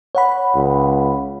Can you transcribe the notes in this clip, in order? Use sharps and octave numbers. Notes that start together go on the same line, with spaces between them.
C#5 F#5 B5
C#2